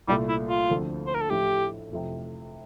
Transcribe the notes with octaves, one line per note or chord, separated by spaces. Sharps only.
C2 A#2 G3 A3
E4
F4
D2 D3 F3 C4
C5
A#4
A4
A1 A2 F3 A3 E4 G4
F1 F2 C3